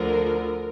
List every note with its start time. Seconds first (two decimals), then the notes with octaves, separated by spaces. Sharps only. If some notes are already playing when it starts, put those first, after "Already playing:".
Already playing: D2 D3 F3 A#4